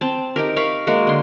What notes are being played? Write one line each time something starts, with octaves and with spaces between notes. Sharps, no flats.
C4 A5
D#4 G4 A#4
A#4 F5 B5 C#6
G#3 A#3 F#4 A#4
D3 C6